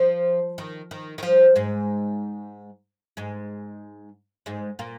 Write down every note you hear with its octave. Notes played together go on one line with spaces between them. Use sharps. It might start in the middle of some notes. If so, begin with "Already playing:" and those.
Already playing: F3
D#3
D#3
D#3
F3
G#2 G#3
G#2 G#3
G#2 G#3
A#2 A#3